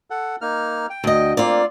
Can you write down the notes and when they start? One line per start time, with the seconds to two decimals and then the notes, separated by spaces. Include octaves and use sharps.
0.10 A4 F#5
0.41 A#3 D#4 F6
0.90 G5
1.04 D2 D#5
1.37 A#3 C4 F4 D5